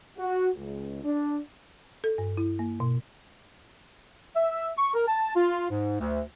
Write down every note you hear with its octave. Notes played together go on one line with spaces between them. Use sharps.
F#4
C#2
D4
A4
G2
E4
A#3
B2
E5
C#6
A#4
A5
F4
G#2
D2